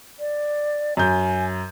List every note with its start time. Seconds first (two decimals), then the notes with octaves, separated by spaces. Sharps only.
0.20 D5
0.97 F#2 G#5 G6